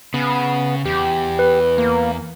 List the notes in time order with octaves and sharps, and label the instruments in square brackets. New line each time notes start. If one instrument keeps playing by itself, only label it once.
[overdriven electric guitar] C#3 [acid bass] B3
[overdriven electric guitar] E2 [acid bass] G4
[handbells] B4
[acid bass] A#3